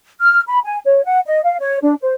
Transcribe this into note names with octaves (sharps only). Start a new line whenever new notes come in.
F6
B5
G#5
C#5
F#5
D#5
F5
C#5
D4
C5